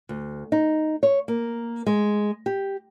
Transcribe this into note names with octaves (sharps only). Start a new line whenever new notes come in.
D2
D#4
C#5
A#3
G#3
G4